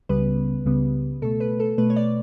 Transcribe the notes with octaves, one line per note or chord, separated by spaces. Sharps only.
C#2 C#3 G3 B3 B4
C#2 C#3 G3 B3
B2 A3 A4
B4
A4
B2 A3 B4
C#5
D5